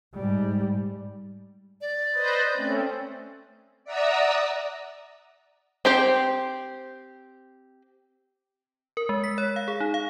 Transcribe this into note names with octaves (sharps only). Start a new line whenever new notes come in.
G#2 G3
D5
B4 C5 D#5
A3 C4 C#4
D5 E5 F#5 A#5 D#6 E6
C4 G4 C5
A#4
G#3
B6
C#5
F5
G#4
D#4
F5